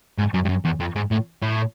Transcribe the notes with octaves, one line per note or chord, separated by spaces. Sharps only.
G#2
F#2
G2
F#2
E2
F2
G#2
A2
A2